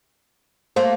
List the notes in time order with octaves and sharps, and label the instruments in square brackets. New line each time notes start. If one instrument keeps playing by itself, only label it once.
[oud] A3 A#3 [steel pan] C5